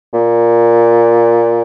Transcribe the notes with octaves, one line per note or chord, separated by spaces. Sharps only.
A#2